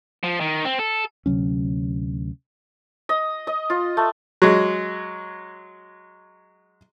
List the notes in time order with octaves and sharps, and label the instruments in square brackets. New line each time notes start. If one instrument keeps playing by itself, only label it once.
[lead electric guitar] F3
D#3
C4
A4
[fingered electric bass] D2 C3 F#3 C#4
[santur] D#5
D#5
F4
A3
[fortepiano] F#3 G#3